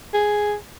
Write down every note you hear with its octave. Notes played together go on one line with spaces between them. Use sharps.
G#4